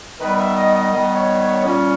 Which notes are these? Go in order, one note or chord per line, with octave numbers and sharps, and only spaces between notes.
D#3 G3 B3 B4
E5
D#5
D#5
D#3 G3 B3 D#5
C#5
C#5
A#2 G3 C#4